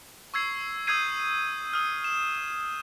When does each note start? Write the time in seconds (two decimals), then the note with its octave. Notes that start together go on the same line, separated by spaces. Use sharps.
0.34 C#6 E6 G#6 C7
0.87 D#6 E6 G6 G#6 C7 D#7
1.73 D#6 F6
2.04 E7